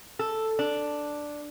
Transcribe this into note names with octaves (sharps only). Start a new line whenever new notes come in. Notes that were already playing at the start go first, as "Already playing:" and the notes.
A4
D4